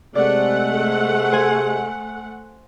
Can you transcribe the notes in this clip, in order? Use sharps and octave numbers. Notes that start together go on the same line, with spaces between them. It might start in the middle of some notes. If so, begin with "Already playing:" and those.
C3 G#3 A3 D5 F#5
C5 G#5